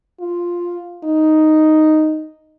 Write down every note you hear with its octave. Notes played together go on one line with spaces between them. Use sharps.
F4
D#4